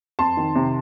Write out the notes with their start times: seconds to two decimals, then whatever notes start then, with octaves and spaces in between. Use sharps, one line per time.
0.19 F2 A5 C6
0.37 D#3
0.55 C3